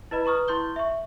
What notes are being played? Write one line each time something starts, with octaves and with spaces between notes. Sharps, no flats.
E4 B4 D#5 B5
B4 A#5 C#6 D#6 F6
E4 C6 G6 G7
E5 C#6